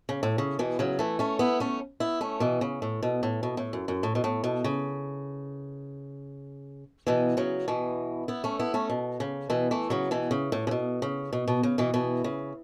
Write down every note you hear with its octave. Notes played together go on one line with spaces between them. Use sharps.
C#3
A2
C#3
B2 E3
C#3 F#3
E3 A3
A3 C#4
B3 E4
A3 C#4
B3 E4
A3 C#4
B2 E3
C#3
A2
B2
A2
B2
A2
F#2
F#2
A2
B2
A2
B2
C#3
B2 E3
C#3 F#3
B2 E3
B3 E4
A3 C#4
B3 E4
A3 C#4
B2
C#3
B2 E3
E3 A3
C#3 F#3
B2 E3
C#3
A2
C#3
B2
C#3
B2
B2
C#3
B2 E3
B2 E3
C#3